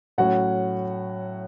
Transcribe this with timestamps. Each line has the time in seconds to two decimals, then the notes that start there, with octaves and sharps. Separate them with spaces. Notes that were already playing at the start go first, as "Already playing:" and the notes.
0.18 A2 F#3 C#4 F#4 F#5